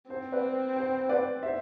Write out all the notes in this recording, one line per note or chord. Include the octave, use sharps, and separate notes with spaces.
C4 C5
B4 D5
C5
B4 D5
C5 E5